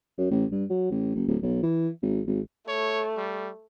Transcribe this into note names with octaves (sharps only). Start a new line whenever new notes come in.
F#2
A1
G2
F#3
A1
F#1
D1
B1
E3
G#1
G#1
A3 C#5
G3